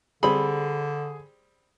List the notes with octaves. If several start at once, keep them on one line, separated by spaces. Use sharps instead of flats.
D3 G3 C4 G#4 B5